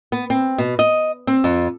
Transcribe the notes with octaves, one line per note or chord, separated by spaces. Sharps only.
B3
C4
B2
D#5
C4
F2